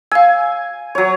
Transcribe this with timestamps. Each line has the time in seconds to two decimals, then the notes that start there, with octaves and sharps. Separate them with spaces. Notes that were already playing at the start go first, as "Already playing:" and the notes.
0.12 F5 G#5 E6
0.95 F#3 C#5